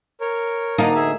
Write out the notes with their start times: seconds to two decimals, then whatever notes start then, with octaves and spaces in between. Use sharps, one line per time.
0.21 A#4 C#5
0.78 D2 A#3 D#4 A5
0.95 G#4 E5